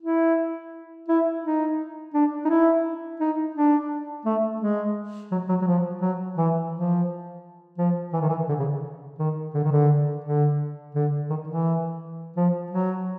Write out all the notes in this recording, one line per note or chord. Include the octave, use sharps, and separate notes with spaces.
E4
E4
D#4
D4
D#4
E4
D#4
D4
A3
G#3
F#3
F#3
F#3
F3
F#3
E3
F3
F3
E3
D#3
E3
D3
C#3
D#3
D3
D#3
D3
D3
D3
D#3
E3
F3
F#3